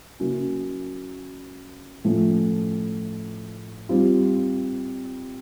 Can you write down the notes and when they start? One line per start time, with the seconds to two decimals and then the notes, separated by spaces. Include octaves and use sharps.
0.20 C#3 F#3 A#3 C#4 E4
2.05 A2 F3 A3 C#4
3.89 G3 C4 F4